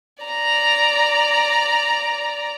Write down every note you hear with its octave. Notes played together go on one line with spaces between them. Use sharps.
D5 A#5